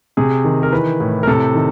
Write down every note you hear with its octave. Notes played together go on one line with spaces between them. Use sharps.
C3 G#4
D#3
A#4
E3 B4
A2
A#4
C3 A4
D#3